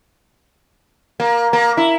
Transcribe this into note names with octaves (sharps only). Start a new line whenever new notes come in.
A#3
A#3
E4